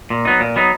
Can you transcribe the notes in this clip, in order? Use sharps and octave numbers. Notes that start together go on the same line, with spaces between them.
A#2
F#3 B3 D#4
A#2
F#3 B3 D#4